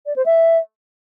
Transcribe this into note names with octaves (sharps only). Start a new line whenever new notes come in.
D5
C5
E5